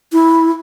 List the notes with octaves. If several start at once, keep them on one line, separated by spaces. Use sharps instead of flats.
E4